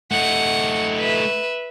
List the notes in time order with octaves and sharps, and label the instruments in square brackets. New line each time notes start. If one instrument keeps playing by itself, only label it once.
[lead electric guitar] A3 D#4 [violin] F#5
[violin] B4 E5